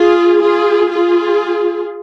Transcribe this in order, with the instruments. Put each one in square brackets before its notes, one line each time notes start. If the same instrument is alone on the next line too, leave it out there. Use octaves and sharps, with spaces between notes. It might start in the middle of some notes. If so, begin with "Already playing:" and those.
Already playing: [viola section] F4 G#4
F4 G#4
F4 G#4